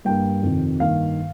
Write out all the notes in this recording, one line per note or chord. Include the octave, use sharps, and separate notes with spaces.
G2 G3 A#3 G5
F2 C3 D#3
G2 D#3 A#3 F5